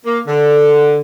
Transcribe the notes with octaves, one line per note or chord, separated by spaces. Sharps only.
A#3
D3